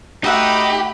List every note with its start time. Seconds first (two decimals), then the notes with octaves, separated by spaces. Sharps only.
0.24 A3 D#4 F#4 G4 E5 F#5 B5